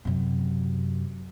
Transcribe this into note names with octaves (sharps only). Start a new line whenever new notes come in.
F#2 C3